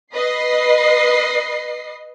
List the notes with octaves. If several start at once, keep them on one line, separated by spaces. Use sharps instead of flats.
B4 D#5 C7